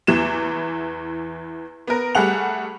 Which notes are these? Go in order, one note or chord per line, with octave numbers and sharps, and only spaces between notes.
E2 E3 E7
B3 A#4
G3 A3 G#4 F#5 F7